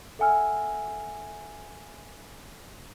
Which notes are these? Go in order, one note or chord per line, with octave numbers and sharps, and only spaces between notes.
A4 E5 F#5 G#5 E6 F6